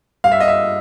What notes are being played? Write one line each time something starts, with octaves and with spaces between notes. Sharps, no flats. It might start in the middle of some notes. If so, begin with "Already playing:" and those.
G2 F5
E5
D#5
E5